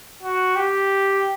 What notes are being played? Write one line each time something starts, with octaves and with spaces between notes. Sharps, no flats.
F#4
G4